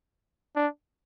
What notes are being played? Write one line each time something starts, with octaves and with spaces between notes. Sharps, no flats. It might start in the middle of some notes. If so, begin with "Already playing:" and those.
D4